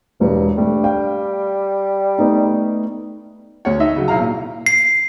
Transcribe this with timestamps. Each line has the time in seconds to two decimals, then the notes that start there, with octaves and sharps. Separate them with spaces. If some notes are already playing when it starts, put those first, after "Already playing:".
0.21 E1 G2
0.58 G3 A3 D4
0.83 D5 F5 G5
2.19 A3 B3 D#4
3.65 D2 C#5
3.80 D#4 D#5 E5
3.95 C#3 F#3
4.08 B1 E4 F5 A#5
4.20 A#2
4.66 C7